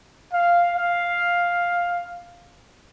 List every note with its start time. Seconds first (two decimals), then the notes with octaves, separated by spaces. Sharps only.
0.33 F5
0.76 F5